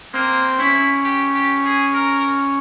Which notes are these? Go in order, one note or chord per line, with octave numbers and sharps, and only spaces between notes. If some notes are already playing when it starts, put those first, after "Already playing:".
A#3 C4
C#4 E4
G4
G4
G#4
A#4